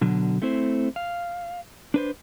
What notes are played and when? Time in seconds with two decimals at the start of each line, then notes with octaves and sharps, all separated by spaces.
0.01 B2 D3 F#3
0.42 A3 C4 E4 C5
0.96 F5
1.94 D4 B4 C5